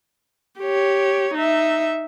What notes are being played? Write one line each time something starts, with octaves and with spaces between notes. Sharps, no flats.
G4 C#5
D#4 E5